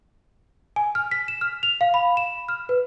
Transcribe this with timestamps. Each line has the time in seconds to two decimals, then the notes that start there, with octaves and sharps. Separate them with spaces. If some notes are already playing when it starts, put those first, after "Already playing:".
0.76 G#5
0.95 F6
1.11 B6
1.28 E7
1.41 F6
1.63 F7
1.81 F5
1.94 B5
2.17 E7
2.49 F6
2.69 B4